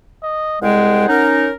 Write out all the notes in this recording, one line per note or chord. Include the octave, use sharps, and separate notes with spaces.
D#5
C2 G#3 G#4 F#5 G5
C#4 D#4 A#4